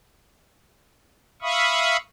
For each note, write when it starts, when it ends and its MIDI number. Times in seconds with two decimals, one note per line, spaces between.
1.42 1.97 76
1.42 1.97 77
1.42 1.97 83
1.42 1.97 85
1.42 1.97 87